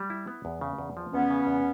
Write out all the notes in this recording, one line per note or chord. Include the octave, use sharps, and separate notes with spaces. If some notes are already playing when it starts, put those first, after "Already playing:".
Already playing: G3
E4
B3
E2
C#3
E2
F3
E2 B3 C#4
C#3
E2